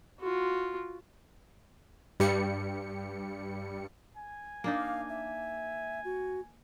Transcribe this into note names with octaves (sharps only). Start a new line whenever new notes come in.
F4 F#4
G2 G3 C#7
G#5
A#3 D4 D#4 F5
E5
F#4